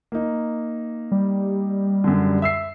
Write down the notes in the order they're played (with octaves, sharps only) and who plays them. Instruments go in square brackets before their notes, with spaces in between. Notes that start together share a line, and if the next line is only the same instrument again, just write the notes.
[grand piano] A#3 D#4
[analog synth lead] G3
[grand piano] F#2 D3
E5 E6 C7